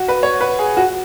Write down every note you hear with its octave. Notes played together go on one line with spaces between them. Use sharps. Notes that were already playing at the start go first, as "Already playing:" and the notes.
Already playing: F#4
B4
C#5
B4
G#4
F#4